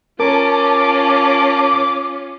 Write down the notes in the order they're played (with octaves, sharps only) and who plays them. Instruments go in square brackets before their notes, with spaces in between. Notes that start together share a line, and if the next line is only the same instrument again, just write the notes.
[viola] C#4 F4 [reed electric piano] A#4 [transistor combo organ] A5 [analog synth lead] D6